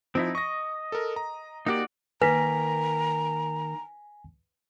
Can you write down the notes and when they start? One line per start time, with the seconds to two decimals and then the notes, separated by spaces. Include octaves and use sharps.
0.15 F3 C4 D#4 E4
0.35 D#5 C#6 A#6
0.92 A4 A#4
1.16 A#5
1.66 A#3 D#4 F#4 G4 D5
2.21 D#3 A#3 B4 G#5 A#5 A#6 B6